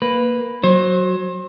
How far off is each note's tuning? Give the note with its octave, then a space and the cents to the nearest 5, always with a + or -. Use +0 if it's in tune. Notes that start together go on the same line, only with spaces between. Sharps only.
A#3 +0 B4 +0
F#3 +0 C5 +30